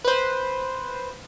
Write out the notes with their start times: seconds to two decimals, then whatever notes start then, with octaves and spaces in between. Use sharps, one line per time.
0.05 B4 C5